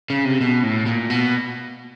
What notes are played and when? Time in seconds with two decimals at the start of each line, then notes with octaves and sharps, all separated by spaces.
0.10 C#3
0.25 C3
0.41 B2
0.63 A2
0.86 A#2
1.10 B2